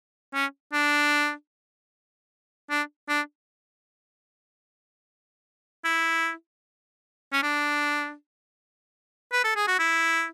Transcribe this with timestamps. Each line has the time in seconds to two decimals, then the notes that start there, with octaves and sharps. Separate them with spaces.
0.34 C#4
0.73 D4
2.70 D4
3.09 D4
5.84 E4
7.32 C#4
7.42 D4
9.32 B4
9.44 A4
9.56 G#4
9.67 F#4
9.79 E4